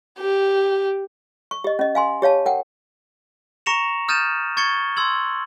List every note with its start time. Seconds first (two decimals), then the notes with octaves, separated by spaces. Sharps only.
0.18 G4
1.51 C#6
1.64 G4 D#5
1.79 C#4 D#5
1.95 F5 G#5 C6
2.22 G4 C#5 F5 A5
2.46 A#4 F#5 G5
3.66 A#5 C#6 A#6 C#7 E7 F7
4.08 D#6 F6 G6 A6 D#7 E7
4.57 C#6 G#6 A6 C#7 G7
4.97 C6 E6 G#6 F#7